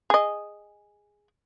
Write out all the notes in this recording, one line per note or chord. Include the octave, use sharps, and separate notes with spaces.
G#4 D#5